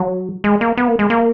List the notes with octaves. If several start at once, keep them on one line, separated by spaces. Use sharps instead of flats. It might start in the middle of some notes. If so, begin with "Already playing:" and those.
Already playing: F#3
G#3
A#3
B3
A#3
G#3
A#3